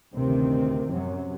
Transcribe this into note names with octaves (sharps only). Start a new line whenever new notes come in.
A1 D2 C3 D#3 C4
F#2 C3 F#3